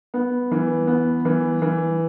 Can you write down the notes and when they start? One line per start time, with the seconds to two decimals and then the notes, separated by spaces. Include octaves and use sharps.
0.14 B3
0.51 E3
0.87 B3
1.25 E3
1.62 E3